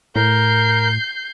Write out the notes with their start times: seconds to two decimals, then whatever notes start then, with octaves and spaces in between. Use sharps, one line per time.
0.16 A2 A#4 G6 C7